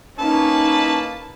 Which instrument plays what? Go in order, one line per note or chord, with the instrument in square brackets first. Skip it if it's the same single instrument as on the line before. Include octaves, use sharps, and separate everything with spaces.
[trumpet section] A#3 B4 [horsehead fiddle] C#4 D#4 [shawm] A5